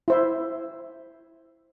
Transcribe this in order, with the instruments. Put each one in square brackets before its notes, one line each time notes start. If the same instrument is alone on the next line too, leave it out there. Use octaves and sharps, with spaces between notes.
[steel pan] E4 C5 E5